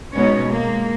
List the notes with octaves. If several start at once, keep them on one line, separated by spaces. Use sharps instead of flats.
B2 G#3 B3 C#4 D#4 C#5
G#3 A#3